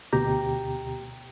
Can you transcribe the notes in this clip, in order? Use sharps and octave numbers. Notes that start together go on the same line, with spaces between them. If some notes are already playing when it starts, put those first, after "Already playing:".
D2 B2 G4 G5 A#5